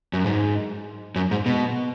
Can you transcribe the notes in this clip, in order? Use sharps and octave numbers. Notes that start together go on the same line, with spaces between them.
F#2
G#2
F#2
G#2
B2